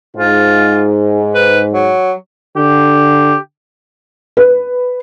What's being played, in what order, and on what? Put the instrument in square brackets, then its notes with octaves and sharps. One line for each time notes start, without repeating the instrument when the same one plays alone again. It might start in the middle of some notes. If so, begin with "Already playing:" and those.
[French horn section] G#2 [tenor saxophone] F4
[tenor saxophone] B4
F#3
[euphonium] D3 [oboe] G4
[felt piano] B4